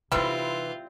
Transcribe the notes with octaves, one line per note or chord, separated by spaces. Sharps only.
C3 E3 G3 A3 C4 D#4 F4